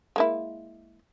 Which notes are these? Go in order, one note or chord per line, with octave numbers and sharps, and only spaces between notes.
G#3 A#3 E4